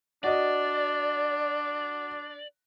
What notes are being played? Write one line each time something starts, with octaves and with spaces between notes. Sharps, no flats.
D4 F#4 D5 D#5